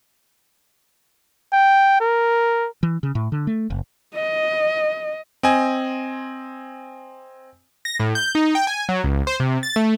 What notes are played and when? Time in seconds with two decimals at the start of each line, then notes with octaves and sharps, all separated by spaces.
1.53 G5
2.00 A#4
2.83 E3
3.03 C#3
3.15 A2
3.32 D3
3.47 A3
3.70 F#1
4.15 D#5
5.43 C4 D#5 G#5
7.85 A#6
8.00 A2
8.15 G6
8.35 D#4
8.55 G5
8.67 G#5
8.89 F#3
9.04 C#2
9.27 C5
9.40 C3
9.63 A6
9.76 A3